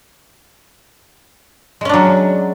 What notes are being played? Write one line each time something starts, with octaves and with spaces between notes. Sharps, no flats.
F#3 G#3 C#4 D4